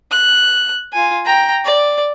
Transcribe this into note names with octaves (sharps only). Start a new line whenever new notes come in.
F#6
F4 G#5
G5 A#5
D5